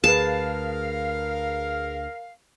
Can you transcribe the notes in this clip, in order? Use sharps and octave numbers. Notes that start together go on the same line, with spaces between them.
D2 G#4 A#4 B4 F5 A5